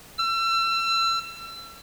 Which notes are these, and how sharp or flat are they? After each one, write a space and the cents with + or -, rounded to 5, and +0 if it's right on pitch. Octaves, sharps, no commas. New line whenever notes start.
E6 +35